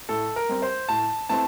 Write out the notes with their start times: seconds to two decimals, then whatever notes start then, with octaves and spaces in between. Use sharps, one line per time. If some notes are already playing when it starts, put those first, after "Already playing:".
0.09 A2 A4
0.36 A#4
0.49 G3 C4
0.62 C5
0.89 A2 A5
1.29 E3 A3 C4 A5